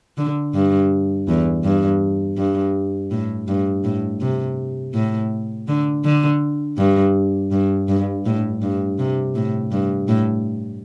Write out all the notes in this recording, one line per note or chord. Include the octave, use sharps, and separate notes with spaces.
D3
G2
E2
G2
G2
A2
G2
A2
C3
A2
D3
D3
G2
G2
G2
A2
G2
C3
A2
G2
A2